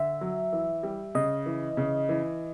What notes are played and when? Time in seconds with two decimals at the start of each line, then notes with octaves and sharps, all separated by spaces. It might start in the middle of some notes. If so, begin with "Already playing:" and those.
Already playing: D3 E5
0.21 F#3
0.53 E3
0.83 G3
1.15 C#3 D#5
1.46 E3
1.77 C#3
2.09 E3